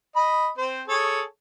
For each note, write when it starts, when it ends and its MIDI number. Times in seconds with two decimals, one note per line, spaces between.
0.16 0.50 75
0.16 0.50 83
0.58 0.82 60
0.58 0.82 72
0.88 1.22 68
0.88 1.22 69
0.88 1.22 73